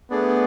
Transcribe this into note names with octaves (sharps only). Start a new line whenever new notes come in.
A3 B3 D4 G#4 D5